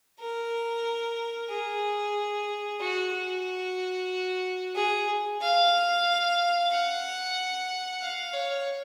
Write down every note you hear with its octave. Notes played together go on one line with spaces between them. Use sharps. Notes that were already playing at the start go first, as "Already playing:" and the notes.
A#4
G#4
F#4
F#4
G#4
F5
F#5
F5
C#5